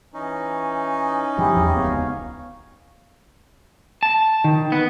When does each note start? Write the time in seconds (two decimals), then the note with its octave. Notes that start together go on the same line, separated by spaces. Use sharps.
0.14 E3 C#4 D#4
1.38 G2 F3 E4 G4 G#4
1.56 E2
1.76 D1 C#2 B3 C#5 F5
4.03 A5
4.44 D#3
4.72 B3